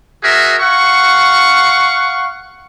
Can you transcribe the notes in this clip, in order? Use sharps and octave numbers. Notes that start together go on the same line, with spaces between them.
F#4 G#4 A#4 E5
F5 F#5 C#6